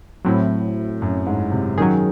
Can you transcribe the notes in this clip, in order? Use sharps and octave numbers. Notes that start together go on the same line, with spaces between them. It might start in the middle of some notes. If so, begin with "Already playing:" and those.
A2 F#3 C4 E4
F#2
G#2
C3
D#3 F#3 C#4 G#4